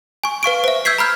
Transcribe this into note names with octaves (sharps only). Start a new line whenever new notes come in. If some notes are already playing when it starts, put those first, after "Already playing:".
G#5 C#6
B4 F5 C#6 D7
C5 E5
E6 G6 G#6 B6 C7
A#5 B5 F6 G6